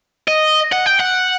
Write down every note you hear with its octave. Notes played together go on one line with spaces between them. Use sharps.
D#5
F#5
G5
F#5